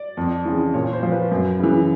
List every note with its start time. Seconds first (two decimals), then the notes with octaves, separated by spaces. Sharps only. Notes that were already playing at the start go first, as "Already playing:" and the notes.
Already playing: D5
0.17 F2
0.45 C#3 E3
0.74 A#2 C#5
0.93 C5
1.03 F3
1.12 B4
1.31 F#2
1.59 C#3 E3